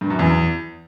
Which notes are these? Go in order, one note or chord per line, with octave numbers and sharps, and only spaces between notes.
G2
F#2
E2